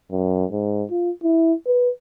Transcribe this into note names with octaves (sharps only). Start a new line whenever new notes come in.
F#2
G#2
F4
E4
B4